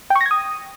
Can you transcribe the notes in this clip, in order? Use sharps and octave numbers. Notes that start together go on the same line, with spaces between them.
G5
C#6
A#6
G#6
D#6